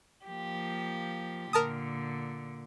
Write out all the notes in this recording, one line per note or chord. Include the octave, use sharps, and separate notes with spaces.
F3 A#3 G4
A#2 D3 A#4 A5 D#6